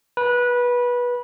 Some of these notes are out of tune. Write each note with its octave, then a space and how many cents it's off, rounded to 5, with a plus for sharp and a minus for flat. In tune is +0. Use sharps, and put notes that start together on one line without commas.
B4 -20